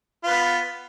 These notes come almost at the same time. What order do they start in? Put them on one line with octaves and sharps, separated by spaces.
F4 B4 B3